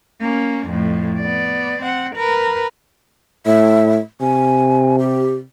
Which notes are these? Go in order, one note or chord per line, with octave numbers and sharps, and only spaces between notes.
A#3 C#4
F2 A2
B3 D5
C4 F#5
A#4 B4
A2 E5
C3 G#5
G4